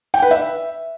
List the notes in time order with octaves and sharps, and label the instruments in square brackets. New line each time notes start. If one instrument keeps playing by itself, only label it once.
[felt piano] G5
B4
E5